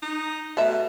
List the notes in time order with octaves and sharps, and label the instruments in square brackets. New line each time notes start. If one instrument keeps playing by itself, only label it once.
[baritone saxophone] D#4
[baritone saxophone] B2 [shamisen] A3 E5